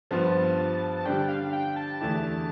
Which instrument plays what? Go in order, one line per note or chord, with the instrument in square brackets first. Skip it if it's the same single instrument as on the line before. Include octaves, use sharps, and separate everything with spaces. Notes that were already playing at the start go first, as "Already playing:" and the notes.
[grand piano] G2 F3 B3 F4 [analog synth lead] A5
[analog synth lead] A5
[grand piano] D3 G3 D4 [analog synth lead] G5
[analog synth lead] F5
G5
A5
[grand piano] E2 D3 A3 E4 G4 [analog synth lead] A5